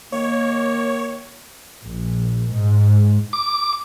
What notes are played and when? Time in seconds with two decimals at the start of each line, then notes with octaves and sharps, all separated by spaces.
0.12 D#3 A#3 C#5
1.83 A#1
2.49 G#2
3.33 D6